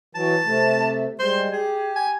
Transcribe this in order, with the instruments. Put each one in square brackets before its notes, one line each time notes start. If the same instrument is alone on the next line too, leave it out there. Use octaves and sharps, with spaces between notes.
[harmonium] E3 F#3 [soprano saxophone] A5
[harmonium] C3 A3
[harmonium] G3 G#3 [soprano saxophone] C5
[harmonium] G4 [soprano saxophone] G#4
[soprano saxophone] G#5